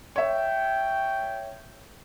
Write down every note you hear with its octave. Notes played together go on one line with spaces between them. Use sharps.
C#5 E5 G5